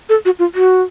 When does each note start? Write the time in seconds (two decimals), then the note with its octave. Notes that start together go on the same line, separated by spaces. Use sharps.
0.09 A4
0.25 F#4
0.39 F4
0.55 F#4